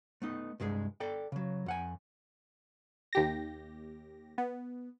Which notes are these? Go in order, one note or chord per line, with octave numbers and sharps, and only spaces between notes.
A3 B3 D#4
C2 G2 G#3 G#4
A4 D5 G5
C#3 F#3
F2 F#5 G#5
D#2 G4 A#6
B3